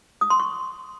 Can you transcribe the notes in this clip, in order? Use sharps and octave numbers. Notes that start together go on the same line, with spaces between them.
D#6
C6
C#6